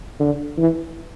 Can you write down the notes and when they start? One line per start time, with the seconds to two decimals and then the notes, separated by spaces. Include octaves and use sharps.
0.19 D3
0.58 E3